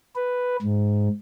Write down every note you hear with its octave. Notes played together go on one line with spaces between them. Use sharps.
B4
G#2